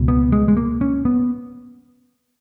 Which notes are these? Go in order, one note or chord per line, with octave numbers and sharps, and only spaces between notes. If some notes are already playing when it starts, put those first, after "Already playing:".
Already playing: C#2 B2
B3
G#3
G#3
A#3
C#4
B3